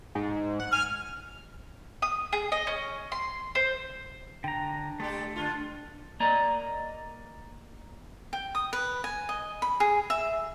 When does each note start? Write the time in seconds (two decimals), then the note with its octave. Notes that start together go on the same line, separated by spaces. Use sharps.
0.15 G#2
0.60 F#5
0.73 G#5 F6
2.02 D#6
2.33 G#4
2.52 D#5
2.67 C#4
3.12 C6
3.55 C5
4.44 D3 D4 G5 A#5
5.00 G3 A3 G4 A4
5.36 D3 D4 F4
6.20 A#3 D5 D#5 A#5
8.33 G5
8.55 D#6
8.73 B4
9.04 G#5
9.29 D#5
9.62 B5
9.80 G#4
10.10 E5